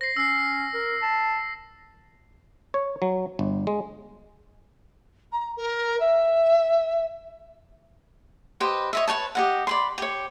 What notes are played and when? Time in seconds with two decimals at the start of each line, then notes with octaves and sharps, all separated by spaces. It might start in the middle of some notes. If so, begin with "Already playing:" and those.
0.01 C5 A#6 C7
0.17 C#4 E6 C7
0.74 A#4
1.02 A5
2.74 C#5
3.02 F#3
3.39 G1
3.67 G#3
5.31 A#5
5.56 A#4
5.99 E5
8.60 G4 B4 C5 D#5
8.93 C#5 D#5 E5
9.08 B4 C#5 G5 A5
9.35 G4 D#5 F#5
9.67 D5 B5 C6
9.98 G4 C#5